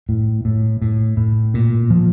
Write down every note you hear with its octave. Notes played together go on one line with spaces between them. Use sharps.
A2
A2
A2
A2
A#2
F3